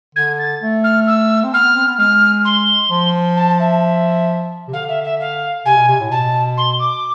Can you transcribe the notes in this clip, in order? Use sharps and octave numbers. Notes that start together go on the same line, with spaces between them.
D3 G#6
A6
A3
F6
E6
C4
B3 F6
B3
C4
B3
G#3 F6
C6
F3
A5
E5
C3
D3 F5
E5
E5
F5
C3 G#5
B2
C3
A2
B2 A5
C6
D6